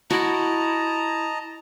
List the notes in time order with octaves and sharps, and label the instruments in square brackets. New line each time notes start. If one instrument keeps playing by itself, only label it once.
[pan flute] E4 [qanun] F#4 [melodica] D#5 A5 A#5